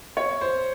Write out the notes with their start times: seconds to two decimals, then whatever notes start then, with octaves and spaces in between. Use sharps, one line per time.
0.17 C#5
0.41 C5